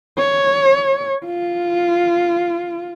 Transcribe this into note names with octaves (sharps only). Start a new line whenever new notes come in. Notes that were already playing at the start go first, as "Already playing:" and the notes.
C#5
F4